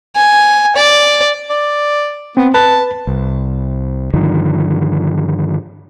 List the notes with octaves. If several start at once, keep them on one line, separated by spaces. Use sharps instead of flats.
G#5
D5
D5
B3 C4
B4 A5
C2
G2 D3 D#3 F3